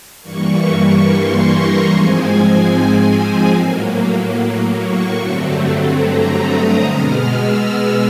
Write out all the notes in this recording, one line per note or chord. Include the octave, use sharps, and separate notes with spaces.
G2 E3 G3 A#3 C#6
C6
A#5
G#2 F3 G#3 C4 G#5
A2 F#3 A#3
C#6
G2 D3 F#3 A3 C4
A#5
D#6
B2 G#3 B3 F6
E6